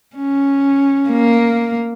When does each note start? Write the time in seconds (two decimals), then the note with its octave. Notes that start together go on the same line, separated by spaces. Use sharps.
0.16 C#4
1.10 A#3